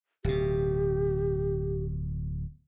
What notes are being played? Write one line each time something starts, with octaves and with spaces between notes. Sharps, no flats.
D1 B2 G4